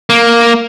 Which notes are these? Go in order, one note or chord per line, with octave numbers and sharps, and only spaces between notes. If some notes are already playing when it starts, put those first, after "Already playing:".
A#3